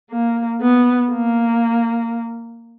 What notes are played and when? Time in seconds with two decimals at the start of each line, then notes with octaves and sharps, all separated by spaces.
0.11 A#3
0.62 B3
1.12 A#3